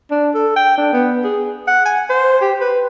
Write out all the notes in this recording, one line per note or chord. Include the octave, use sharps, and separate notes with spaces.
D4
A4
G5
D4
B3
G#4
F#5
G#5
C5
G4
B4